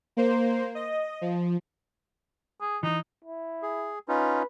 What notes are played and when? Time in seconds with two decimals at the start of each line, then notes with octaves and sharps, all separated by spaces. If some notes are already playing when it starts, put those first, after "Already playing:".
0.17 A#3 C5
0.75 D#5
1.21 F3
2.61 G#4
2.83 E3 D#4
3.24 E4
3.62 G#4
4.08 C#4 D#4 F4 B4